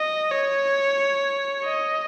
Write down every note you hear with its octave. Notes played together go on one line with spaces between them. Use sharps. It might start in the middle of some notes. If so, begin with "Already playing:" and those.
Already playing: D#5
C#5
D#5